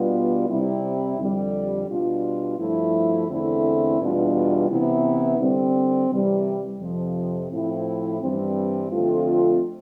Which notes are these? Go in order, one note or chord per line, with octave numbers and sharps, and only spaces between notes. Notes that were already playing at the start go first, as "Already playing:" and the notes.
Already playing: B2 G3 B3 D4 F4
C3 G3 C4 E4
F2 D3 G3
B2 G3 D4 F4
G2 F3 A3 E4
E2 D3 A3 C4 E4
E2 B2 G3 D4 F4
C3 E3 B3 E4
D3 G3 C4
C3 E3 G3
F2 C3 F3
A2 F3 C4 E4
G2 E3 G3 C4
F2 D3 A3 C4 F4